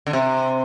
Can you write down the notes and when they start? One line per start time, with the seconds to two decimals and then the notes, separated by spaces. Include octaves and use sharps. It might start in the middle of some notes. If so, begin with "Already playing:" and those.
0.07 D3
0.13 C3